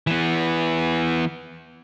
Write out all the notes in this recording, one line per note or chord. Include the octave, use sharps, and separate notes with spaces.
E3 B3